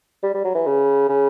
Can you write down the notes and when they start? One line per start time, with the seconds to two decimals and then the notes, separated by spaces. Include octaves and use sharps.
0.23 G3
0.34 G3
0.45 F#3
0.55 E3
0.66 C#3
1.09 C#3